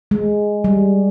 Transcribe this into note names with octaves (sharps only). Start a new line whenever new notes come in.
G#3
G3